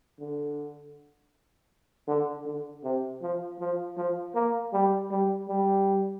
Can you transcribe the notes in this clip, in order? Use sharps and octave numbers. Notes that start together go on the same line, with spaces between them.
D3
D3
D3
C3
F3
F3
F3
A#3
G3
G3
G3